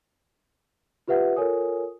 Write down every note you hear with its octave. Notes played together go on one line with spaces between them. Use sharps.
F4 G4 B4 E5 F#5
F4 A4 A#4 C#5 G#5 D#6